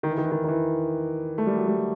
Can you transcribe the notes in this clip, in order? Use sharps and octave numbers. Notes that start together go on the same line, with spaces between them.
D#3
E3
D#3
E3
D#3
D#3
E3
A3
G3
F#3
G3